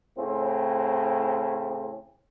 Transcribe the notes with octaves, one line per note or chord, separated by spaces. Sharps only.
A2 C#3 C4